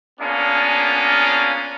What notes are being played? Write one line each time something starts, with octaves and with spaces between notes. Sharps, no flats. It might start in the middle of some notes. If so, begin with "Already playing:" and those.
A#3 B3 C#4 D4 F4 G#4